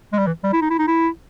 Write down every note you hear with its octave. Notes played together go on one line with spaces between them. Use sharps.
G#3
G3
E3
G3
E4
D#4
E4
D#4
E4